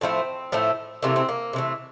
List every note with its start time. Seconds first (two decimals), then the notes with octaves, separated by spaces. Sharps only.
0.01 A2 F3 A3 C4
0.52 A2 F3 A3
1.02 C3 E3 A3 A#3
1.16 C4
1.29 A#3
1.53 C3 E3 A3